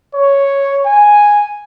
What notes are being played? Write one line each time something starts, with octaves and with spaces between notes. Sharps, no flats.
C#5
G#5